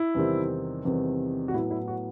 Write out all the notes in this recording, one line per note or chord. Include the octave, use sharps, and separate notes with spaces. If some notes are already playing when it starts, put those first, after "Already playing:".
Already playing: E4
E2 C3 D#3 G3 C4
E2 C3 D#3 G3 C4
F#4
A2 F#3 B3 E4
E4
F#4